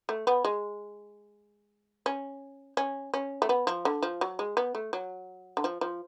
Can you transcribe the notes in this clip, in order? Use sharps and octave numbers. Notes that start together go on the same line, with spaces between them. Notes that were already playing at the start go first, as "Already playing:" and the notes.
A3
B3
G#3
C#4
C#4
C#4
A3
B3
F3
D3
F3
F#3
G#3
B3
A3
F#3
D3
F3
F3